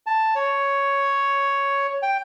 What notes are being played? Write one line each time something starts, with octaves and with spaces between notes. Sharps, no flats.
A5
C#5
G5